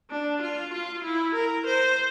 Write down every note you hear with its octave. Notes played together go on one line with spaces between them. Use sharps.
D4
F4
F4
E4
A#4
C5